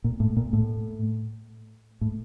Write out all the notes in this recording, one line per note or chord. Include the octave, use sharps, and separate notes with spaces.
A#2
A2
A#2
A2
A2